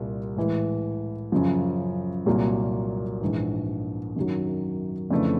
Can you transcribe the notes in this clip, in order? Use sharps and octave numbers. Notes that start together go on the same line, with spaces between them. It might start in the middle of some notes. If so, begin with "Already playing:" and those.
Already playing: C2 A#2 G3
A2 E3 G#3
F#2 C#3 F3
C2 A#2 F#3 A#3
A#1 G#2 E3
F#2 D#3 F#3
F2 C#3 E3 A3 D4